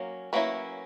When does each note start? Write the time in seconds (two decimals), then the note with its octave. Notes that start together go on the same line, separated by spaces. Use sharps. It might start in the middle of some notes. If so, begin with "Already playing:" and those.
Already playing: F#3 A#3 C#4
0.33 F#3 A#3 C#4 E4 B4